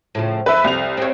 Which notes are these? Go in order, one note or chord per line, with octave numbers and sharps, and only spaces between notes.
A2 C#3 F3
F2 B4 E5
C2 F7
C4 C#5